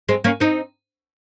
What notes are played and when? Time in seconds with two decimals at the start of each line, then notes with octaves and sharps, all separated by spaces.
0.09 G#3 C4
0.24 A#3 C#4
0.40 C4 D#4